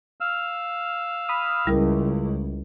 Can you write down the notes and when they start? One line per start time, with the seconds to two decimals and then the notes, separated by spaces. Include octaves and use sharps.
0.21 F5 E6 F6
1.29 B5 D#6
1.67 C#2 G3 E4 A#4